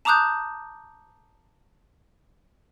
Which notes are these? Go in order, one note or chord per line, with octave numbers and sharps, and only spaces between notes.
A5 A#5 D6 D#6 F#6 G6